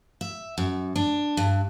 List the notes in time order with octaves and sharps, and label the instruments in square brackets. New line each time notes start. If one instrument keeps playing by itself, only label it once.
[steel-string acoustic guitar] E5
F#2
D4
G2